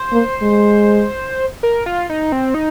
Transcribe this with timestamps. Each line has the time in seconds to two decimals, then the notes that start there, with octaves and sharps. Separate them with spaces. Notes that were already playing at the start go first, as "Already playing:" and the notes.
Already playing: C5
0.12 A#3
0.42 G#3
1.63 A#4
1.86 F4
2.10 D#4
2.32 C4
2.54 D#4